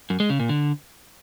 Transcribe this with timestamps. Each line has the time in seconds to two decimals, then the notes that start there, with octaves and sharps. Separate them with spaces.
0.10 F#2
0.20 G#3
0.30 C#3
0.40 A#2
0.49 D3